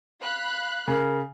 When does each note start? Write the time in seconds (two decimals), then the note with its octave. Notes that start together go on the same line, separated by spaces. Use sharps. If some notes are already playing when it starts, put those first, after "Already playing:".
0.21 F5 B5 F#6
0.88 C#3 A#4